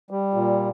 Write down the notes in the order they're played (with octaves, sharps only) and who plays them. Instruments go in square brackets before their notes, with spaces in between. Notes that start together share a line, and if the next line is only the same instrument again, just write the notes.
[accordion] G3
A#2